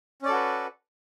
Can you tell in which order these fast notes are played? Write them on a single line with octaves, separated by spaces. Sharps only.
C#4 D5 A4 F#4 B4